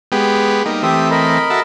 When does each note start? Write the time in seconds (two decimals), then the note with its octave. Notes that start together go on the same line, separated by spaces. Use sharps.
0.12 G#3 B3 G4
0.66 G3 A#3 D#4
0.82 E3 A3 C4 G4 E5 D#6
1.10 A#4 D#5 B5
1.50 F#4 A4 E5